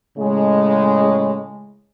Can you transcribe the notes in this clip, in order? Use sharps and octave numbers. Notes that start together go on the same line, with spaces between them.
A2 C#3 G#3